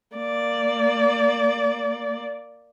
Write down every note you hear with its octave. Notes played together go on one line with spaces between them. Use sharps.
A#3 D5